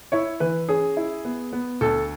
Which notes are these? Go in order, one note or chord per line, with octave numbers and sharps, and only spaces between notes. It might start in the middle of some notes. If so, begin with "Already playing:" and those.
E4 C#5
E3 B4
C#4 G#4
E4
B3
B3
D2 A4